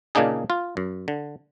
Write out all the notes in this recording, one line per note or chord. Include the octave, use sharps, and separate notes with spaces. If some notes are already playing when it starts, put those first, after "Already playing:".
A#2 C#3 A#3 D4 D#4 G#4
F4
F#2
D3